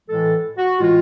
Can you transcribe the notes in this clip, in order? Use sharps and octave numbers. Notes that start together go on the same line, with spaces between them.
A2 E3 G#3 A4
F#4
A2 E3 G#3 F4